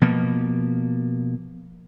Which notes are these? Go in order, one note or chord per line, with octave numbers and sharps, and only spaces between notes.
B2 F3 A#3